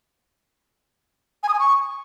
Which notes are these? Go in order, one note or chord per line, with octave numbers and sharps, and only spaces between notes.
G#5
D#6
G#5
C#6